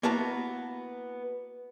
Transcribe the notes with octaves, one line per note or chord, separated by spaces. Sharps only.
A#3 B3 E4 F#4 A5 A#5